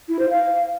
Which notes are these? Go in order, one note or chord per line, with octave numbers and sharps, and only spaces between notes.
E4
C5
F5